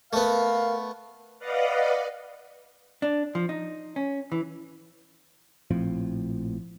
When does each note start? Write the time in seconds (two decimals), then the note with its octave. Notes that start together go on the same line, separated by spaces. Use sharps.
0.13 A3 B3 A#4 F5
1.39 B4 D5 D#5 F5 F#5
3.02 D4
3.35 F3
3.49 D#4
3.96 C#4
4.32 E3
5.71 A#1 A2 F3 C4